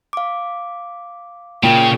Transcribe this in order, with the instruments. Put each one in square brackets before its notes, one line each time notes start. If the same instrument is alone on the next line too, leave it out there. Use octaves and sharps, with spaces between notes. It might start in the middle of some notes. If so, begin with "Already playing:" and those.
[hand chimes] F5 D6
[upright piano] A#2 [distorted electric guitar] C#3 [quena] G5